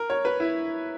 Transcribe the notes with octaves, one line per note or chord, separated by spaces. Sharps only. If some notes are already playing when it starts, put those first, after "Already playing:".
Already playing: A#4
C#5
B4
E4